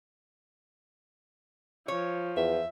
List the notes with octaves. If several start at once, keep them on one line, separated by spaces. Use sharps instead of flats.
F3 C#5
E2 E5